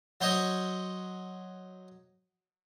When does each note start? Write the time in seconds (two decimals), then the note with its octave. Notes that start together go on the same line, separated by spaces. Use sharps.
0.21 F#3 C5 C#5 D#5